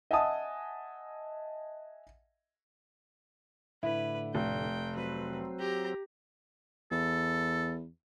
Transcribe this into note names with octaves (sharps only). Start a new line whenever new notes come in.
D#5 E5 F#5 G#5 A5 D#6
A2 D3 E4 B4
F1 G5
F#3 C4 B4
G4 A#5
E2 A4